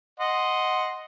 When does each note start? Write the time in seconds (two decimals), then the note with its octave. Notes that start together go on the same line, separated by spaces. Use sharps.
0.20 D#5 F#5 C6